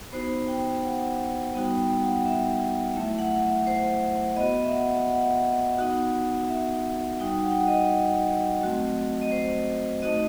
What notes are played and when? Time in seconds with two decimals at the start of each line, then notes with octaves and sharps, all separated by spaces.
0.12 B3 D#4 F#4 C5
0.48 G5
0.83 F#5
1.54 G3 B3 D#4 F#4 G5
1.78 G5
2.02 F#5
2.25 E5
2.95 F#3 A3 E4 E5
3.18 F#5
3.43 E5
3.67 C5
4.36 B3 F#4 D#5
4.64 E5
4.72 F#5
5.08 F#5
5.79 B3 D#4 F#4
6.49 E5
7.19 G3 D#4 F#4 G5
7.43 F#5
7.51 G5
7.59 F#5
7.67 D#5
8.61 F#3 A3 C4 F#4
9.21 D#5
9.32 C5
10.02 A3 D#4 F#4 D#5